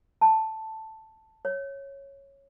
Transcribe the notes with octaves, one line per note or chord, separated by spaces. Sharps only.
A5
C#5